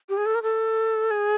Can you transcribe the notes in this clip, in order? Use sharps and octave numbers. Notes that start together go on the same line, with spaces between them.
G4
G#4
A4
A#4
A4
G#4